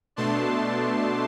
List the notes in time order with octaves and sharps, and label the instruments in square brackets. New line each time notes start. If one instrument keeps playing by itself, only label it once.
[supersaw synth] B2 A3 D4 A5 C6